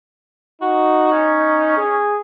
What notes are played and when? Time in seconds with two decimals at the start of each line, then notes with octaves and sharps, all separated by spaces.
0.61 D#4 F#4
1.12 C#4
1.77 G#4